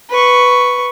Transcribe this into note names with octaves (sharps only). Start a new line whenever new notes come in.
B4 C#6